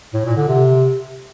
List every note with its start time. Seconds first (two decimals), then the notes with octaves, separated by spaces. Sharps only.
0.14 A2
0.25 A#2
0.37 D3
0.48 C3